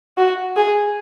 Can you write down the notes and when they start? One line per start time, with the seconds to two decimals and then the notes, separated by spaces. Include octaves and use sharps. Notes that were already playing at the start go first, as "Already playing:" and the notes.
0.18 F#4
0.56 G#4